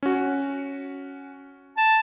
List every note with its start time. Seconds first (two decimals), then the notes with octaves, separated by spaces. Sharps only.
0.03 C#4 F#4
1.77 A5